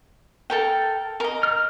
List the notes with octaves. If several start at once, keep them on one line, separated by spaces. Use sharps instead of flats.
A4 A#4 G5
A#4 D#5
F6